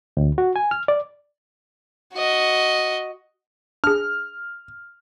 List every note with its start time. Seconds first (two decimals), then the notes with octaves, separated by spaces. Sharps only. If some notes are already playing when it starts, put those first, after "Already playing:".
0.17 D2
0.38 F#4
0.56 G#5
0.71 F6
0.88 D5
2.13 F#4 D#5
3.84 D4 G#4 F6